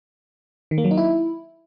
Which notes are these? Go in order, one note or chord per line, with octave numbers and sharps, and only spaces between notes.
D#3
A#3
F#3
D#4
E4